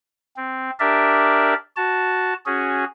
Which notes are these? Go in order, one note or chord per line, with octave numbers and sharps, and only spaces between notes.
C4
D4 G4 A#4 D5 E5
F#4 A5
C#4 F#4 G#4